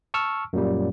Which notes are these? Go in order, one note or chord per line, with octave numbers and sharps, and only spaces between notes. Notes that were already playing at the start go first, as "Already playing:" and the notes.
A5 C#6 E6 F6
F#2 A#2 G3